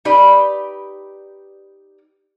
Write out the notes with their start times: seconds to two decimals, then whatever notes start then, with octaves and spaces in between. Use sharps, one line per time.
0.05 D#4 G4 B4 D5